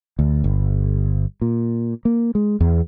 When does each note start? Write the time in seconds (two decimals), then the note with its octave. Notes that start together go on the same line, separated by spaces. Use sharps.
0.19 D2
0.44 G1
1.41 A#2
2.05 A#3
2.35 G#3
2.60 E2